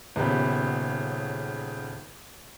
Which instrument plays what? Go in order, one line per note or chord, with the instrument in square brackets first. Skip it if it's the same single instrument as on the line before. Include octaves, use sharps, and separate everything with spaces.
[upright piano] D#1 C#3 B3 G4